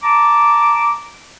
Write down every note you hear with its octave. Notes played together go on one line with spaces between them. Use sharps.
A5 A#5 D6